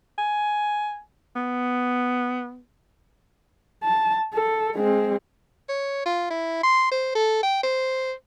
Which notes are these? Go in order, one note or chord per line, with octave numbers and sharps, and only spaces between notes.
G#5
B3
A5
A4
G#3 C4
C#5
F4
E4
C6
C5
A4
G5
C5